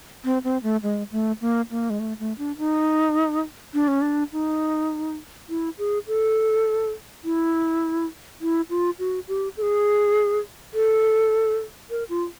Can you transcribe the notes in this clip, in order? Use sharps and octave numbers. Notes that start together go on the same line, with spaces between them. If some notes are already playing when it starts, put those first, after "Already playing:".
C4
C4
A3
G#3
A3
A#3
A#3
G#3
A3
A3
D4
D#4
D4
C#4
D4
D#4
E4
G#4
A4
E4
E4
F4
F#4
G4
A4
G#4
A4
A#4
F4